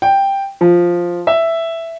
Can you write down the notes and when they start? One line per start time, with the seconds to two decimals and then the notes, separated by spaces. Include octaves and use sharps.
0.02 G5
0.61 F3
1.27 E5